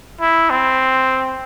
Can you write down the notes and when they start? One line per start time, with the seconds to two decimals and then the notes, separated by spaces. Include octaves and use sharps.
0.21 E4
0.50 C4